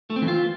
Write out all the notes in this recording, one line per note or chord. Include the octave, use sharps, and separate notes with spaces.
A3
C4
E3
F4